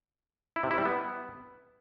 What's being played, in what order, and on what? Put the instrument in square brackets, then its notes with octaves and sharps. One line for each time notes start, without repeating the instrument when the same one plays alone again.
[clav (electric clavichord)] E4
C3
E4
G3
B3